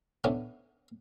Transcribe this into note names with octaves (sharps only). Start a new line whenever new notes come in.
D3 E3 B3 C#4 D4